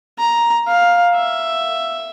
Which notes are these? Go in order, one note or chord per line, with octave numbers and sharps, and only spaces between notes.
A#5
F5
E5